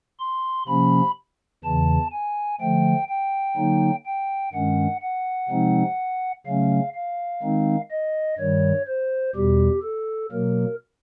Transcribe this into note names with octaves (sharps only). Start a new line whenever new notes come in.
C6
C3 F3 A#3 C#4 B5
E2 C#3 E3 A5
G#5
D3 F3 A3 G5
G5
D3 F#3 A#3 D#4
G5
G2 D#3 G#3 C#4 F#5
F#5
C3 F3 G#3 C4 D#4
C#3 F#3 A3 C#4 F5
F5
D#3 G#3 C4 D#4
D#5
G2 D#3 G3 C#5
C5
E2 B2 G3 G4
A4
B2 F#3 A#3 A#4